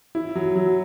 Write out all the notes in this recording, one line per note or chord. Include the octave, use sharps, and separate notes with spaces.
E4
F#3
F#3